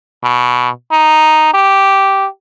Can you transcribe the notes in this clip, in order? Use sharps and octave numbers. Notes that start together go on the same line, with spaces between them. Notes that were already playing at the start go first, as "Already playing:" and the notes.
B2
D#4
G4